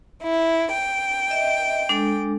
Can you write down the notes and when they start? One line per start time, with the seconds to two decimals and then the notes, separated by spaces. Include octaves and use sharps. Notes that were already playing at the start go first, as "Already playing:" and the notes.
0.22 E4
0.72 G5
1.30 D#5 E5
1.89 G#3 D4 A4